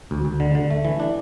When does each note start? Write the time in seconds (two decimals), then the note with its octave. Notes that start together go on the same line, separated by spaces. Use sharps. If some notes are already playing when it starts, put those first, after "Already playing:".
0.11 D2
0.25 D2
0.40 D3
0.55 D3
0.70 A3
0.85 E3
1.00 D4